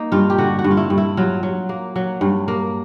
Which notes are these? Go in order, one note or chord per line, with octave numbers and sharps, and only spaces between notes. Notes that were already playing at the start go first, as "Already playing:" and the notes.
Already playing: A#3 D#4
G2 F4
G4
D3 F#4
F#4
G2
F4
E4
G2
E4
F#3 F4
F#3
A#3
F#3
G2
A#3